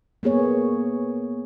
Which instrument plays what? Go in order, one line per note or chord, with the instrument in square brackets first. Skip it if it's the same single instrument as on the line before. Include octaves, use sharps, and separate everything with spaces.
[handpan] A#3 B3 G#4 C#5